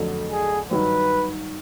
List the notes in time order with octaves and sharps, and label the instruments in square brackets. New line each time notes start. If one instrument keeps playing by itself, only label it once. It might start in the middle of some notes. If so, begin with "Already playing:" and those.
Already playing: [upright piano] F2 D3 F#3 A3
[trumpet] G#4
[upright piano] G2 D#3 F#3 [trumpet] B4